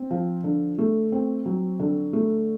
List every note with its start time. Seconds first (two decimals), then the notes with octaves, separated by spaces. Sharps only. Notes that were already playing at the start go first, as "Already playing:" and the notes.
Already playing: C4
0.11 F3
0.44 D3
0.78 A3
1.12 C4
1.46 F#3
1.80 D3
2.13 A3